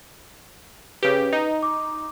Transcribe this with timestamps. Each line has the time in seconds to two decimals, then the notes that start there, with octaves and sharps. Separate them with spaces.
1.03 C#3 G4 B4
1.33 D#4
1.63 D6